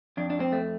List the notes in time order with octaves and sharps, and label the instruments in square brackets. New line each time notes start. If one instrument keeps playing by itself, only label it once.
[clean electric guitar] F2 D4
D4
C4
A3